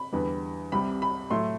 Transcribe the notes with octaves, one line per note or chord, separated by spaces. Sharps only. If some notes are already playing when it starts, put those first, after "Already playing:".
Already playing: B5
E2 D3 G3 B3
C2 C3 G3 B5
B5
A2 F#3 A3 E4 C6